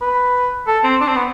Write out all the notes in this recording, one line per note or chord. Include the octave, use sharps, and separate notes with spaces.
B4
A4
C4
D4
C4
B3